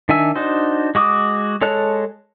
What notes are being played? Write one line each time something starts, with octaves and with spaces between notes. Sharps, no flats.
D#3 D4 E5 G#5 E6
D4 D#4 F#4 C5
G#3 F#4 D6 D#6
G#3 A4 C#5 A5 F#6